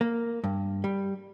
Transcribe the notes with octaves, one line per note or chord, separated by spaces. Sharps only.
A#3
G2
G3